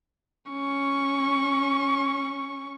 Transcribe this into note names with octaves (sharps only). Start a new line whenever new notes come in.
C#4 C#6